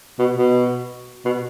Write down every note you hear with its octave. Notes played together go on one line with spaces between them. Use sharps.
B2
B2
B2